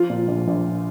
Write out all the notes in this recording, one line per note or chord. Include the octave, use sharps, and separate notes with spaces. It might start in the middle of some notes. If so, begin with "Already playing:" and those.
Already playing: F3 F4
A#2
A#1
A#1